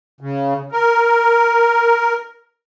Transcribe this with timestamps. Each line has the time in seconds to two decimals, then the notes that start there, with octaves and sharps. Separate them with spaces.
0.21 C#3
0.72 A#4